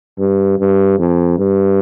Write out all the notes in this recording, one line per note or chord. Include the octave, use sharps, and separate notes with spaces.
G2
G2
F2
G2